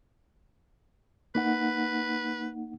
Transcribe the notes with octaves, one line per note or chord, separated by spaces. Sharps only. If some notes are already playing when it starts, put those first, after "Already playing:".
A#3 D#4 B4 F#5